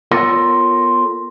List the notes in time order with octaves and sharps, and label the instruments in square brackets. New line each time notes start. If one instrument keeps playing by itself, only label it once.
[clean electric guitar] B3 F4 A4 A#4 C#5